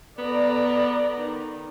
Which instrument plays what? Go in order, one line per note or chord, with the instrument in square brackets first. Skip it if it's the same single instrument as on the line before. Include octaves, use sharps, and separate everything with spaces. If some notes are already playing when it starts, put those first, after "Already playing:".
[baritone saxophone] B3 [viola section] A4 D5 A#5
[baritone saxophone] D#3